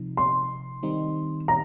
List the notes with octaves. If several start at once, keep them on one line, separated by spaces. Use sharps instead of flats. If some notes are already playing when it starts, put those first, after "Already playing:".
Already playing: C3 F3 D#4
C6
D#3 G3 C4 D#4
A#5